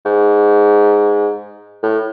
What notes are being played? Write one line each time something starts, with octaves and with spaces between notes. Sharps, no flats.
G#2
A2